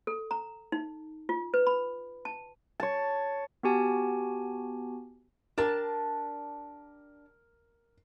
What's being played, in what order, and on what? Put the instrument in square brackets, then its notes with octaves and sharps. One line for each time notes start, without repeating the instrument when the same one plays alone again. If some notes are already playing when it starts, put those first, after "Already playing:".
[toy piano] A4
A#5
D#4
F4
B4
B5
A5
[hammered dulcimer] C#5 A5
[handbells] B3 F#4 G4 G#5 A5
[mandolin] D4 G4 A5 [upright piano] A#4